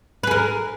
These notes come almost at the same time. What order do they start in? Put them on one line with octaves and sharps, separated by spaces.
B4 G#4 A#4